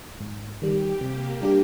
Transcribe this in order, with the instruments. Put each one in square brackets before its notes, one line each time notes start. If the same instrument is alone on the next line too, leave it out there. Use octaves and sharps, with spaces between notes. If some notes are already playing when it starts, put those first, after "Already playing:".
[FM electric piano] G#2
[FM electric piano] D#3 G3 [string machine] G4
[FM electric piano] C3 [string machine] A#3
[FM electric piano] G3 D4 G4